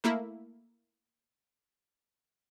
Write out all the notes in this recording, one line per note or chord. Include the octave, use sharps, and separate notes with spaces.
A3 A#3 E4